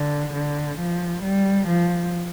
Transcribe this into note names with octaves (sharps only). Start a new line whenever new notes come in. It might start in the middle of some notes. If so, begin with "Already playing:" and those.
Already playing: D3
D3
F3
G3
F3